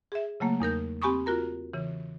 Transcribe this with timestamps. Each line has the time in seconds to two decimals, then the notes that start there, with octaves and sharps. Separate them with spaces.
0.12 G#4 E5
0.40 C#3 F#3 A3 A#3
0.60 E2 D#4 A#4 G6
1.02 C4 G4 G#5 B5 C#6 D#6
1.26 F4 F#4 A#4 A#5
1.73 C#3 E3